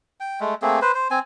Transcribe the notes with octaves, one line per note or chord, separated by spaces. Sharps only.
G5
G#3 A3
A3 A#3 C4 G#4
B4 C5
C5
C4 G#5